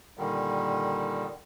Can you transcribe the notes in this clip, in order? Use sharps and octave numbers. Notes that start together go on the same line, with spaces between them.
A#2 D3 D#3 G3